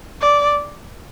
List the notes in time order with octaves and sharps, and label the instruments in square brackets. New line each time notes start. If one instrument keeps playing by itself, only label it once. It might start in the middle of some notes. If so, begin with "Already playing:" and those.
[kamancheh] D5